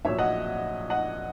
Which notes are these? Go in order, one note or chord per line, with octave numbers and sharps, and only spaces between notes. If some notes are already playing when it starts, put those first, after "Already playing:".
A#1 A#2 F#3 C#5 E5
D#5 F#5
D#5 F#5